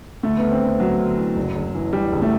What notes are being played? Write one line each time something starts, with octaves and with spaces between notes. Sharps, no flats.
D2 A3
D2 B3
C4
D2
D2 F#3
D2
E3
F#1
F#1
E3
E3 G3
F#1
A3